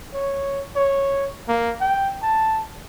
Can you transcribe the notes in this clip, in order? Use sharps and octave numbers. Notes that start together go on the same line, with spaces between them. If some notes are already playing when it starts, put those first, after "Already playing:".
C#5
C#5
A#3
G5
A5